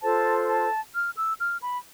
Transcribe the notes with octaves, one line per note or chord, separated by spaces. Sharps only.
F4 A4 C5 A5
A5
F6
E6
F6
B5